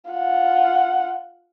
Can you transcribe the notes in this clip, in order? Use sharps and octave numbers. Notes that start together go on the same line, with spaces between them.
F4 F#5